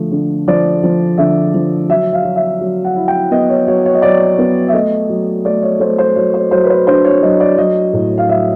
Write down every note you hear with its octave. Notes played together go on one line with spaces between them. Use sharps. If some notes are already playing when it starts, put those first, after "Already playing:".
Already playing: D3 F3 A3
D3
F3 D5
F3
D3 E5
F3
F#3 E5
F5
F#3
E5
F#3
F#5
E4
G5
B3 D#5
C#5
F#3 C#5
C#5
D#5
F#3 D5
B3
E5
A3 D#5
F#3
A3 D5
C#5
A3 C5
C5
F#3 C#5
C5
F#3 C5
B4
C5
D4 C5
C#5
F#3 D#5
D5
F#3 D#5
A2
F5
F#3 E5